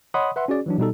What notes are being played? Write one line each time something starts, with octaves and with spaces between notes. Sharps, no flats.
C#5 D#5 F#5 B5 C6 D#6
B4 E5 F#5 C6
C#4 F#4 G#4 D5
E3 F#3 D4
B2 G3 D#4 A4